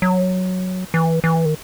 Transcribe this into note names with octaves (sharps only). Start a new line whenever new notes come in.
F#3
E3
E3
D#3